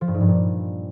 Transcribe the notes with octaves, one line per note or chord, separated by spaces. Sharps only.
F3
G2
G#2
G2
A#2